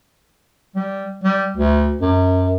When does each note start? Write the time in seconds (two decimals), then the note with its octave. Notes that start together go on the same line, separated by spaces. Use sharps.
0.76 G3
1.23 G3
1.56 D2
2.01 F#2